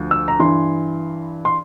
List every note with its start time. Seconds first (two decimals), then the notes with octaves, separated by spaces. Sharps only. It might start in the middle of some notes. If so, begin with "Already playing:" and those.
Already playing: D2 F3
0.11 E6
0.28 A#5
0.39 G2 E3 C6
1.45 C6